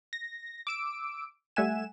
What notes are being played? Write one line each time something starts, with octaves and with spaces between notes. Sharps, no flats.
A#6
D6 E6 D7
G3 A3 E5 F#5 G#5 E7